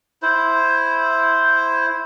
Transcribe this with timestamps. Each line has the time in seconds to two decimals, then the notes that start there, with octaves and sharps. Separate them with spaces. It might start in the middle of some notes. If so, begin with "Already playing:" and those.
0.22 E4 C5